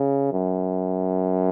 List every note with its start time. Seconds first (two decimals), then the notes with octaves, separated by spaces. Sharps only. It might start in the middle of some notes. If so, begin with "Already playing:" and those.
Already playing: C#3
0.32 F#2